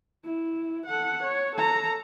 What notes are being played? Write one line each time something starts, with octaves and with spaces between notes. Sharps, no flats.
E4
A4 F#5
C#5
A4 A#5